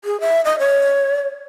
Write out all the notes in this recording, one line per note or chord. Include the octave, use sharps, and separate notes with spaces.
G#4
E5
D#5
C#5